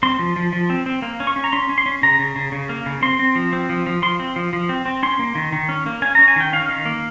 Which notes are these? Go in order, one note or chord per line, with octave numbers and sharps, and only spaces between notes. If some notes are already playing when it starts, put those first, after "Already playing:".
C4 C6
F3
F3
F3
C4
C4
A#3
C#4
C#6
C#4
A#5
C#4 C6
C#4
C6
C#4
C#3 A#5
C#3
C#3
C#3
A#3
C#3
C4 C6
C4
F3
C4
F3
F3
F3 C6
C4
F3
F3
C4
C4
C#4 C6
A#3
D#3
D#3
C#4
A#3
C#4 G#5
C#4 A#5
G#5
D#3 G5
C#4 F5
D#3
A#3